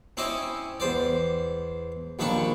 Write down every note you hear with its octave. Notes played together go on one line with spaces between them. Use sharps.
C4 C#4 E4 D5 D#5 G#5
E2 C5 D5
A#1 D#2 D4 G5 B5 C#6